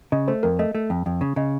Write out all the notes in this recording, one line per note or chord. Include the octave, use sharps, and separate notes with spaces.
C#3 D#5
A3 C5
F2 A#4
A3 D#5
A3
F2
F2
C#3
C#3 D#5